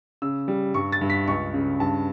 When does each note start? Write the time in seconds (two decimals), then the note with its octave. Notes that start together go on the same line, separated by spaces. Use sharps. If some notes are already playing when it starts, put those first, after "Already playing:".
0.22 C#3 E6
0.48 G3
0.74 G2 C#6
0.92 A6
1.01 G2
1.10 B6
1.28 C#2 C#6
1.54 C#3
1.80 G2 A5